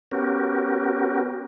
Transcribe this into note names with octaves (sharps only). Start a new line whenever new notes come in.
B3 C#4 F#4 G4 A#4